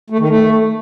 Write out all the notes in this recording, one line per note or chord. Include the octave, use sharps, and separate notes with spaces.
A3
D#3
A3